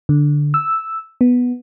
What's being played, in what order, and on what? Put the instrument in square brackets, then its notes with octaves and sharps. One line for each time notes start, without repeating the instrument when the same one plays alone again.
[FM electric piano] D3
E6
B3